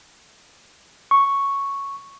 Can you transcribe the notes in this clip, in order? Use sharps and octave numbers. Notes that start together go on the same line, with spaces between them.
C#6